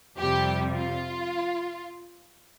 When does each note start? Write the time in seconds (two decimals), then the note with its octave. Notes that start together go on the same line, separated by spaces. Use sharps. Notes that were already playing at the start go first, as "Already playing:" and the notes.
0.18 F2 C3 G3 G4
0.72 F4